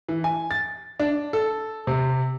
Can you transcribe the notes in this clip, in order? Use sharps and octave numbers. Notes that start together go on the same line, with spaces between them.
E3
G#5
A6
D4
A4
C3